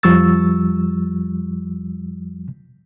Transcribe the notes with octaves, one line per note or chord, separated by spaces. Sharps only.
F2 F3 G3 C#6 E6 A6